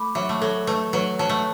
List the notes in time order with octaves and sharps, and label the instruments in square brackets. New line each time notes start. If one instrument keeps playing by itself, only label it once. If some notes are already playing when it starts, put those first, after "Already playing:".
Already playing: [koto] A3 [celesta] B5 D6
[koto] F#3 [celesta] E5
[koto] A3
[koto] F#3 [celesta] A4
[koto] A3 [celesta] B4
[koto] F#3 [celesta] B4
[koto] F#3 [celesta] A5
[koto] A3